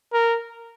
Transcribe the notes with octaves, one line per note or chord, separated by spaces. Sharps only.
A#4